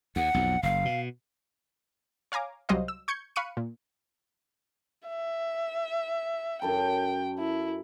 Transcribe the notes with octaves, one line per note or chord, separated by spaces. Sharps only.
D#2 F#5
B1 F2
F#1 F5
B2
C#5 F5 G#5 A#5 D6
C2 F#3 G3 C5 D#5 F5
E6
C#6 G6 G#6 C#7
F5 B5 C#6 F#6 C#7 D#7
A#2
E5
F#2 A4 G5 B5
E4